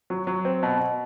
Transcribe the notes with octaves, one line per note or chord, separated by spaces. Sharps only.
F#3
F#3
C4
B2
B2